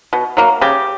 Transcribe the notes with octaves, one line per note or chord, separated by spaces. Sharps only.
B2
F#3 A#3
C#3 G4